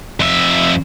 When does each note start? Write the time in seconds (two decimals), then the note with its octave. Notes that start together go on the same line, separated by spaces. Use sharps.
0.20 F2 E5